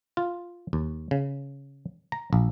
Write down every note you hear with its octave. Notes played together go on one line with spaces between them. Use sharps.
F4
D#2
C#3
A#5
A#1